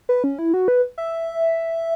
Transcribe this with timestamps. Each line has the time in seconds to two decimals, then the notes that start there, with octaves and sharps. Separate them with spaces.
0.09 B4
0.24 C#4
0.39 E4
0.54 F#4
0.68 B4
0.98 E5